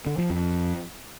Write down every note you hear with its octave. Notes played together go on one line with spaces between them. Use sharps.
D3
F3
F2